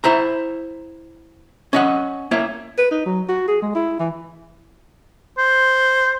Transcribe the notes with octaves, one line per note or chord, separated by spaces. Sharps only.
E4 C5 A#5
C#4 D#5 F#5
A#3 E4 C#5
B4
D#4
F#3
F#4
G#4
G#3
E4
E3
C5